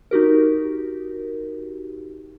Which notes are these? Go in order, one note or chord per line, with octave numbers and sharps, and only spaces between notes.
D#4 F#4 G4 A#4